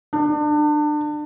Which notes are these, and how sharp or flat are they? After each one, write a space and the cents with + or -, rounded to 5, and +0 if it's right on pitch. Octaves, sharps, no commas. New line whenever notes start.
D4 +30